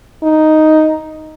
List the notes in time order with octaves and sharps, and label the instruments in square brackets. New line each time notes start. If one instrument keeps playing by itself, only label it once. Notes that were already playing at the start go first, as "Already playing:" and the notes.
[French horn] D#4